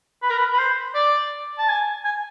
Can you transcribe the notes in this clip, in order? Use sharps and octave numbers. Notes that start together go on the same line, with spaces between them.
B4
A#4
B4
B4
C5
D5
A5
G#5
G#5